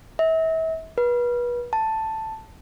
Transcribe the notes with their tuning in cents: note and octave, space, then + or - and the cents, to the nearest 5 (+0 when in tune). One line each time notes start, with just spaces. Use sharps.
E5 -35
B4 -30
A5 +5